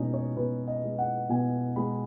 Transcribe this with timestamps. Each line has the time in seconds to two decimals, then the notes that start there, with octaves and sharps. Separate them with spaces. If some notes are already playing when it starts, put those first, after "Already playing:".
Already playing: B2 G#3 C#4 D#4
0.14 C#5
0.37 B2 B4
0.68 D#5
0.84 G#3
0.98 F#5
1.29 B2 G#5
1.76 G#3 B5